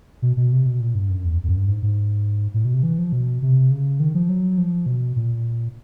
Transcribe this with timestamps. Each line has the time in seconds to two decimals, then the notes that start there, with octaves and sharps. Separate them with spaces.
0.22 B2
0.37 B2
0.52 C3
0.66 B2
0.80 A#2
0.95 G2
1.10 F#2
1.25 E2
1.43 F2
1.49 F#2
1.58 G2
1.68 G#2
1.82 G#2
2.54 A2
2.65 B2
2.74 C3
2.83 E3
2.98 F3
3.12 B2
3.42 C3
3.71 C#3
4.00 D#3
4.15 F3
4.29 F#3
4.58 F3
4.86 B2
5.16 A#2